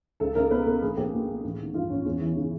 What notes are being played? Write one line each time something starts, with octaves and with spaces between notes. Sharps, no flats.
C#2 A4
C#2 A#4
B2 B4
B2 A#4
A#1 G#4
A#1 G4
A#2 F#4
A#2
A1
D#3
G2 F4
A1 C#4
E2 C#4
E3
C#3